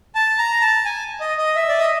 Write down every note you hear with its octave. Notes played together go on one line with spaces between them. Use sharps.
A5
A#5
A5
G#5
D#5
D#5
E5
D5
D#5